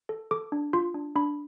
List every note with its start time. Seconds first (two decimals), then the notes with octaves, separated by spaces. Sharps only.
0.09 A4
0.31 A4 D6
0.52 D4
0.73 F4 C6
0.94 D4
1.16 D4 B5